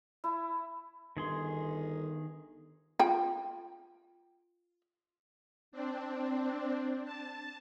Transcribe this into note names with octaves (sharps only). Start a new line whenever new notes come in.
E4
G1 D#3 G#4 C6
F4 G5
C4 D4
A5